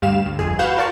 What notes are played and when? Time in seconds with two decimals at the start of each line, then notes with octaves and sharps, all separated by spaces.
0.02 D2 G2 G3 F5 E7
0.26 D2
0.39 G1 F2 G#4
0.59 F#4 B4 F5 F#5 G6 E7
0.77 F4 A#4 D5 A5 C#6